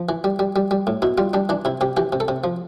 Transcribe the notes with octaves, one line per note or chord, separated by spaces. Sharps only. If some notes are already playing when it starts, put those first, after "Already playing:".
Already playing: F3
E3
G3
G3
G3
G3
A2
B2 E4
G3 F4
G3 D4
E3 D4
C3 E4
C3 G4
E3 G4
C3
A4
C3
F3